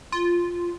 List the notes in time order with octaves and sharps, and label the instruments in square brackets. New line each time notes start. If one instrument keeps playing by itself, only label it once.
[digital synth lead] F4